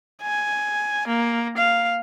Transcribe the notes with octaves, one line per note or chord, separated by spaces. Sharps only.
G#5
A#3
F5